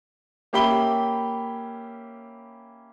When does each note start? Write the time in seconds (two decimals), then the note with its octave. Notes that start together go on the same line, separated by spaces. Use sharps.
0.53 A#3 C#4 G4 E5 B5 G7